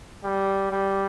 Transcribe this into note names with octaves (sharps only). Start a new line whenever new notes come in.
G3
G3